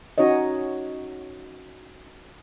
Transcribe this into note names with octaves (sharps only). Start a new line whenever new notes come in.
C#4 D#4 F#4 C#5 D#5